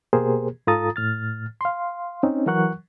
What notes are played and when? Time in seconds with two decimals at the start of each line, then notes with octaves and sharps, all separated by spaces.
0.13 B2 A#3 G4 G#4 A#4 C5
0.67 G#2 F4 A4 A#5 D#6 A6
0.96 A2 F6 A6
1.61 F5 C6
2.23 C4 C#4 D#4
2.46 E3 F#3 A#4 F#5 C#6 F#6